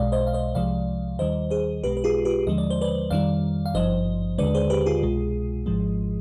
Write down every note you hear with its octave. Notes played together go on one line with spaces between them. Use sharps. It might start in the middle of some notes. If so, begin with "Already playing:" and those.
Already playing: B1 B2 G#3 D5 F5
C5 D#5
F5
C5 D#5
C2 C3 F3 G#3 D5 F5
D#2 D#3 G3 C5 D#5
G#4 C5
B1 B2 G#3 G4 B4
B4
F4 G#4
G4 B4
D#2 D3 F3 G#3 D#5
D5
C5
B4 D5
F2 D#3 G3 D5 F5
F5
G#1 G2 F3 C5 D#5
D#2 D3 G#3 B4 D5
G#4 C5
G4 B4
F4 G#4
C2 B2 G#3
G#1 G#2 F3 G#3